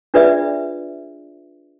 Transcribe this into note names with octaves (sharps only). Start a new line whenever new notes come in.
D4 F4 G#4 B4 D5 E5